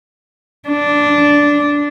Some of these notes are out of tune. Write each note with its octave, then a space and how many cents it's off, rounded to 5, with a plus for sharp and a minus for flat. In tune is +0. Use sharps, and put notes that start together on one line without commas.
D4 -10